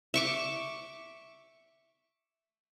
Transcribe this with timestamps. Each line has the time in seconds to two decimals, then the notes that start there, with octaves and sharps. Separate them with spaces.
0.14 E5 C#6 D6